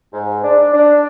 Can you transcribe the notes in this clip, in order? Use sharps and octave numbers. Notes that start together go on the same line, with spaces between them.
G#2
D4
D4